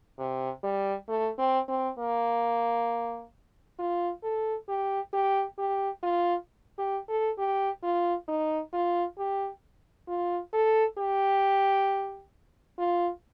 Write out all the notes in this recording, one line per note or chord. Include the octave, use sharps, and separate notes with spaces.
C3
G3
A3
C4
C4
A#3
F4
A4
G4
G4
G4
F4
G4
A4
G4
F4
D#4
F4
G4
F4
A4
G4
F4